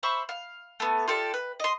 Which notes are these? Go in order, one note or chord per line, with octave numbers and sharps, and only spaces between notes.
C5 E5 B5 C#6
F5
A3 B3
F4 G4 A4 D5
B4
D#5 C6